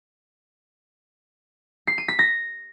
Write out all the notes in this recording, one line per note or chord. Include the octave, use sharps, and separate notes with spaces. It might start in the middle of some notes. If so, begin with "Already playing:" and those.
C7
D#7
B6
A#6